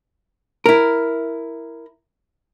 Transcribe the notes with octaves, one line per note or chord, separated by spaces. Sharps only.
E4 A#4